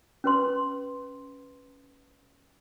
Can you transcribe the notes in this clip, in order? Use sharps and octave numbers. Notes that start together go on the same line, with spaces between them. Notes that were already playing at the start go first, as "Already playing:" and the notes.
C#4 B4 C6